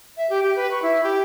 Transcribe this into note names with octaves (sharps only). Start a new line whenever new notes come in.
E5
G4
G4
B4
C#6
E4
G4